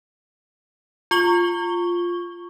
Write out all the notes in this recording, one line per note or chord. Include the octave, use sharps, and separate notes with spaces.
F4 C#6 G7